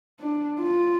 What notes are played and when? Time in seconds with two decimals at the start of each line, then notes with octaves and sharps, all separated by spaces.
0.21 D4
0.61 F4